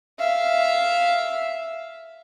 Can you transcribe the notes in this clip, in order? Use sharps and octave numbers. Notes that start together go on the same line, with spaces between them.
E5 F5